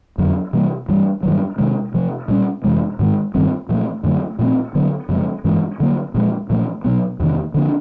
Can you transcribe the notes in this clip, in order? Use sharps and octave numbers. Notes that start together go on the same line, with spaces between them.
F2 D3 F#3
C3 E3 G3 A#3
G2 E3 G3
G2 D#3 F#3
C3 D#3 G#3
C3 F3 A3
A#2 G3 A#3 C#4
F2 C3 E3 G#3
G#2 D#3 G#3
G2 D#3 G3 C4
A#2 F3 A3
F#2 D3 F#3 A3
A#2 F3 A3 C4
D3 F#3 B3
F#2 C#3 F3 G#3
G2 E3 G#3 C#4
D3 F#3 A#3
A#2 F3 G#3
A#2 F3 A3
B2 F#3 B3
E2 C3 D#3
D3 F3 A#3 D4